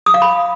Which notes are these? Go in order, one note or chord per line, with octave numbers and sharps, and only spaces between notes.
D#6
F5
B5